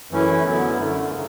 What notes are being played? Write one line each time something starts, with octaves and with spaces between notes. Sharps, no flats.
F#2 E3 A3 C#4 E4
D3 F#3 B3 E4
F#2 D3 A3
C#3